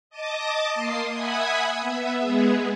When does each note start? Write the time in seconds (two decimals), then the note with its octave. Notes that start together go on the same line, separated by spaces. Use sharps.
0.10 D#5 A5 D6 D#6
0.74 A#3 C6 C7
1.13 E5 F#5 G#5 B5 D#6 G#6
1.81 B3 E5
2.19 G#3 B3 G#4